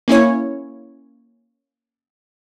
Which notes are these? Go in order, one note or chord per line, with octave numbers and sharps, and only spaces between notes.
A#3 C#4 E4 C#5